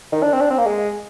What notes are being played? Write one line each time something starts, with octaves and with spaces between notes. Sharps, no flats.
D#3
D4
C4
D4
C4
A#3
G#3